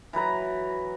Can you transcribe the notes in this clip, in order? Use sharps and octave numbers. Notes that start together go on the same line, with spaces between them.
E3 F#3 B4 A#5